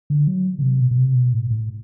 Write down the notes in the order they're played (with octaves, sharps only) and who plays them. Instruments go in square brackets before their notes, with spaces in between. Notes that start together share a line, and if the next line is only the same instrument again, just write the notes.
[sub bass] D3
F#3
D3
C3
B2
B2
C3
B2
A2
A2